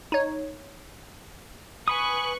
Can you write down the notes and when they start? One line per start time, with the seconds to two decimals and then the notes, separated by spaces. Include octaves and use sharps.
0.12 D#4 C#5
1.88 B4 G#5 B5 C#6 D#6 F#6